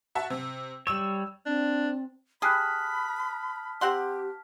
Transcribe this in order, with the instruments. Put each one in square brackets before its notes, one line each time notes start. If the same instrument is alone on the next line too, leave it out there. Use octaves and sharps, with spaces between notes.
[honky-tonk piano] F#4 E5 A5
C3
[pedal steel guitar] G3 C#5 [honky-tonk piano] E6 E7
[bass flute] C4 [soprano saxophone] D4
[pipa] G4 G#4 [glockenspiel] A5 F6 B6 [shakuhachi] B5 [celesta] D#6 F#6
[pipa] C4 F#5 C6 [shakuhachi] G4